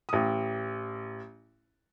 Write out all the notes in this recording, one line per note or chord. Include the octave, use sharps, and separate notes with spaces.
A1 D#6